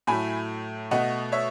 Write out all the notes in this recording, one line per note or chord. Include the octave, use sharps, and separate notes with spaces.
A2 F#3 A3 G#5 B5
B2 A3 D#5 F#5
C#5 E5